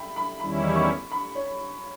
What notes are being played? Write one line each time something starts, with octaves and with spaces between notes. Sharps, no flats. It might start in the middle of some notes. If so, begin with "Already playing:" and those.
Already playing: E5 G5 B5
B5
E2 D#3 G3 C#4 E4 B5
C#6
B5
C#5